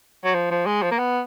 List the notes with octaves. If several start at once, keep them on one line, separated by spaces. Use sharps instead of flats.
F#3
F3
F3
G#3
F3
A#3
B3